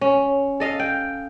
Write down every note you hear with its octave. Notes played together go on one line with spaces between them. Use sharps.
C#4
A4 D#5 F5
G5